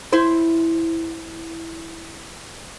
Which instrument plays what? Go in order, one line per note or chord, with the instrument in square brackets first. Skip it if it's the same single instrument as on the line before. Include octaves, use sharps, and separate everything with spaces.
[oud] E4 C5